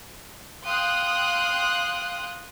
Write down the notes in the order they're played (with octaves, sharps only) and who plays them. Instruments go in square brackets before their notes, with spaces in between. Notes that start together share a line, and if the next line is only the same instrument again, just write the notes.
[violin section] F5 G5 C6 D#6 F#6